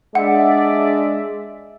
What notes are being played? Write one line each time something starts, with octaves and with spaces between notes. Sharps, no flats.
G#3 D4 D5 E5 F#5